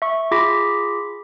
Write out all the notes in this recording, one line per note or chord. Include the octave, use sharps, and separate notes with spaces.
E5 C#6
F4 G#4 B5 D6 A#6 B6